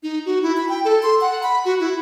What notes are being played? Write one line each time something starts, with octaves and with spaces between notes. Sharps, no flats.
D#4
F#4
E4
B5
G5
A4
C6
F#5
B5
F#4
E4